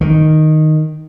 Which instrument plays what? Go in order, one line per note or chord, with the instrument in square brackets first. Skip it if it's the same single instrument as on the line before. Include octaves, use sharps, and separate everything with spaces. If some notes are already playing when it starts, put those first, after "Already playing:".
[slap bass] D#3